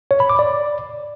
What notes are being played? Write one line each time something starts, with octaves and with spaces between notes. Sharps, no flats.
C#5
B5
D6
D5